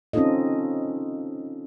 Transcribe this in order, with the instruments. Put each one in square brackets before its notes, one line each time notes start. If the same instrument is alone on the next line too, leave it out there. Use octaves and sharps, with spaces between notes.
[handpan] C4 C#4 D#4 F4 A4 D#5